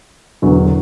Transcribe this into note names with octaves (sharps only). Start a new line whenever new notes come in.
E1 E2 D3 F#3